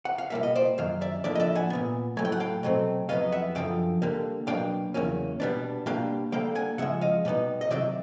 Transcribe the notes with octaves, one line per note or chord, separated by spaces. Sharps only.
F#5
F5
B2 G3 A#3 E5
D#5
C5 D5
F#2 D#3 F#3 F5
D5 E5
A2 F3 A#3 D4 D5 E5
D#5
D5 E5
F#5 G#5
A#2 F#3 B3
A2 F#3 A3 G#5
G5
F#5
F5 G5
B2 F#3 A3 C4
F2 C#3 F#3 B3 D#5 F5
E5 F#5
F#2 D3 F3 F5 G5
D3 G3 A#3
B2 F#3 A#3 D4 F5 G5
E2 C#3 F#3 A#3 C#4
B2 G3 B3 D4
B2 G3 A#3 D4 F5 G5
D3 G3 A#3 F5 G5
F#5 G#5
C#3 F3 G#3 E5 F#5
D#5 F5
B2 G3 B3 D#4
D#5
C3 D#3 F#3 D5 E5